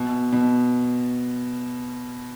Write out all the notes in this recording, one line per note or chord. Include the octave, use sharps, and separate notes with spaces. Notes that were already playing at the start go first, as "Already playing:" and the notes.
Already playing: B2
B2